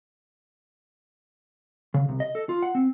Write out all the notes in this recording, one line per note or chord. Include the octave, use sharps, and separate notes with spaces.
C#3
C2
D#5
A4
F4
F#5
C4